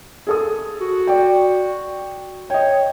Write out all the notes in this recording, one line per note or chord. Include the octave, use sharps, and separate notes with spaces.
G#4 A4 D#6
F#4
D5 G5
C#5 D#5 G5